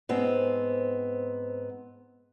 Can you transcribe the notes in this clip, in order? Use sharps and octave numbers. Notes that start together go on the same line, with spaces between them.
G#2 B3 C4